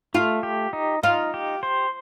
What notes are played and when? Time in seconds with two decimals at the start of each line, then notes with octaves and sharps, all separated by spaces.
0.14 A3 F4
0.43 G4
0.73 D#4
1.03 D#4 F4
1.34 G4
1.63 C5